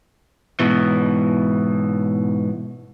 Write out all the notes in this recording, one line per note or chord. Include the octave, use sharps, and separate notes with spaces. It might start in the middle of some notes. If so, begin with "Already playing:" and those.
G#2 B2 E3